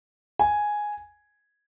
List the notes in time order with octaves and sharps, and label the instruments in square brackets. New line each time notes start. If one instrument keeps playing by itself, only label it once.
[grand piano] G#5